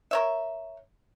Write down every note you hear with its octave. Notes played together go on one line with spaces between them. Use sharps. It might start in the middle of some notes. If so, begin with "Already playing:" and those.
A#4 C#5 E5